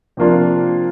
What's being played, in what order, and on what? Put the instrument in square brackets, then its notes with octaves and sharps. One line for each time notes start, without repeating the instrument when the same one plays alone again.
[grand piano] C3 F3 A#3 D4 F4